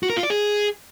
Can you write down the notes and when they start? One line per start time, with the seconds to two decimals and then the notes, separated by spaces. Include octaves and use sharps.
0.03 F#4
0.10 A#4
0.16 F4
0.23 D5
0.30 G#4